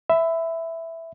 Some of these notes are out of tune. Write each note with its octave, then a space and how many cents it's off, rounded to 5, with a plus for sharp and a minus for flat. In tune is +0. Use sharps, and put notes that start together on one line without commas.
E5 +0 B5 +25